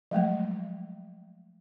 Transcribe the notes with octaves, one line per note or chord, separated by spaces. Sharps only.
F3 F#3 G#3 A3